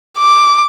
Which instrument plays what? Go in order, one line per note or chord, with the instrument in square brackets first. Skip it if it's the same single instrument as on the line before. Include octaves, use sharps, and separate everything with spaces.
[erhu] D6